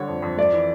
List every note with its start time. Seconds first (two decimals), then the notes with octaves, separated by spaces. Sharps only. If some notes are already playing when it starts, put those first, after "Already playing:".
Already playing: D3 G3 C#5
0.08 F2
0.22 F2
0.37 A3 D5
0.53 E3